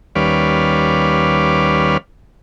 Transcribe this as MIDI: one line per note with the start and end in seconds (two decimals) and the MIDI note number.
0.15 1.97 39
0.15 1.97 55
0.15 1.97 61
0.15 1.97 71
0.15 1.97 74
0.15 1.97 77